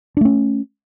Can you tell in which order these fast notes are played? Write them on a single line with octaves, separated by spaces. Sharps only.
D4 A3 C#4